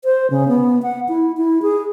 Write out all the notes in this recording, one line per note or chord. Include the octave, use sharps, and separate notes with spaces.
C5
C#3
B3
F#5
E4
E4
G#4